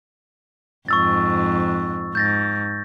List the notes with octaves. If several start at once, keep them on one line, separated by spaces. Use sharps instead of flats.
F2 G#2 C#6 E6 A6
G#2 G6 A6 A#6